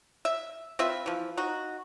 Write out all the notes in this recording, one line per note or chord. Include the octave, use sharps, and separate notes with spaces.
E5
C4 F4 B4 E5
E3 F3
D#4 F#4